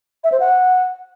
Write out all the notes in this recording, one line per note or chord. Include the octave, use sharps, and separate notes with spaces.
E5
C5
F#5